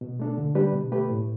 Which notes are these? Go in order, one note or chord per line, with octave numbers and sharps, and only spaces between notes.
B2
A3 D4 A4
D3
G3 D4 G4 B4
B2
A3 G4 B4
A2